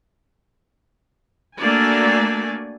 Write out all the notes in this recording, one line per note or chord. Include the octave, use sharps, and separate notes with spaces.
A3 A#3 D4 F#4 D5 G#5